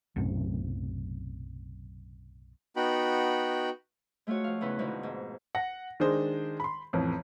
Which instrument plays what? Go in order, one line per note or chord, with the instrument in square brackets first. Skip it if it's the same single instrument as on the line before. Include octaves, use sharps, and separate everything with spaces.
[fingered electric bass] B1 F#2 A2 C3
[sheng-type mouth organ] B3 D#4 F#4 G5 B5
[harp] G#3 A3 F4 F#4 C#5
F3 F5
E2 C#3 E4 B4
F2 B2 D3 G#3 C4 D#4
G#2
[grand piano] F#5 A#6
D#3 G#3 D4 G#4 C5
B5 C6
A1 F2